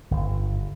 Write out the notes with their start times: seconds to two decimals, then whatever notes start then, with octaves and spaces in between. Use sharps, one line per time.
0.11 G1